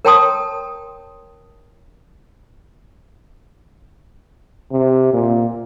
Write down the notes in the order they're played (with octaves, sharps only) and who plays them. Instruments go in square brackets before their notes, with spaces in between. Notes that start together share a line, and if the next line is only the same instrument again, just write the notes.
[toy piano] A#4 C#5 G5 A5 C6 D#6
[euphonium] C3
A#2